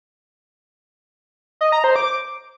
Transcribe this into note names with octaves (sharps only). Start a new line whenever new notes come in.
D#5
A#5
C5
D6